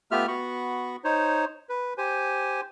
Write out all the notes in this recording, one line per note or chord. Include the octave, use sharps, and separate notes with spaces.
A3 B3 F4 G4 E5 F6
B3 F#4 B5 C#6
D#4 C5 C#5
B4
G4 C5 G#5